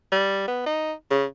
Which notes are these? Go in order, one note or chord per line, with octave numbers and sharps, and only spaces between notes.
G3
B3
D#4
C#3